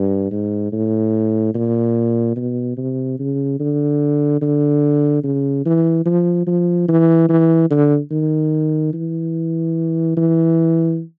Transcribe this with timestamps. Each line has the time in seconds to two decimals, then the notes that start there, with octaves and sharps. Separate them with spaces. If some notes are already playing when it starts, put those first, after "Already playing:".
Already playing: G2
0.31 G#2
0.73 A2
1.55 A#2
2.36 B2
2.77 C3
3.19 C#3
3.60 D3
4.42 D3
5.24 C#3
5.65 E3
6.06 F3
6.47 F3
6.88 E3
7.29 E3
7.70 D3
8.11 D#3
8.93 E3
10.17 E3